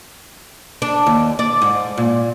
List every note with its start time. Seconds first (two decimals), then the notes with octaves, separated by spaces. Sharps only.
0.82 D4
1.06 D#2
1.39 D5
1.62 G#2
1.98 A#2